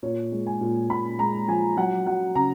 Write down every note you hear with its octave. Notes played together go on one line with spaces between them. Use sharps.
A#2 C#5
G#3
G#5
A#2
A#2 B5
G#3 A#5
F3 G#5
F#3 F#5
F#3 F#5
C#3 A#5